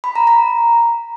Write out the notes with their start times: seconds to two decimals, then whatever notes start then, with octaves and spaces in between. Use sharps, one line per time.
0.04 B5
0.16 A#5
0.27 A#5